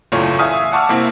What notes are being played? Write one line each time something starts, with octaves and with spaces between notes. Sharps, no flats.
F#1 E2 A2 A3 F4 C#5
E5 F5 G#5 D#6
F#5 A5 C#6 D6 E6 F6
C3 A#3 C4 E4 E6